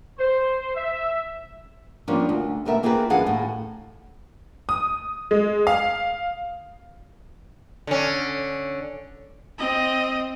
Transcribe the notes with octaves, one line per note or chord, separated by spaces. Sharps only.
C5
E5
F3 G3 A#3 B3 C#4 D4
D2
D#2 B2 A3 A#4 E5
A#3 C4 F4 G#4 A#4 B4
F#2 E3 D4 G#4 F5 F#5
D#2 A2
D#6
G#3
F5
D3 C#4
C4 D#5